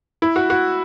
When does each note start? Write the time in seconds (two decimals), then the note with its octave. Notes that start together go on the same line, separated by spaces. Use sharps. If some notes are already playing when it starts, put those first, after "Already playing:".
0.22 E4
0.36 F#4
0.50 F#4